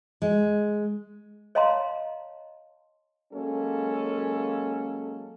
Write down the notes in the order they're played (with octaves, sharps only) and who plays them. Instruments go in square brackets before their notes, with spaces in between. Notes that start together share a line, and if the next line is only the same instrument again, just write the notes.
[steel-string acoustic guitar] G#3
[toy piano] C#5 D#5 F5 A5 A#5 C6
[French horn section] F#3 G#3 A#3 C#4 A4